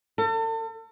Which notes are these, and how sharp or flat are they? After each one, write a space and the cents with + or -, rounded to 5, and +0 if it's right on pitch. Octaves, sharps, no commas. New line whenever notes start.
A4 +40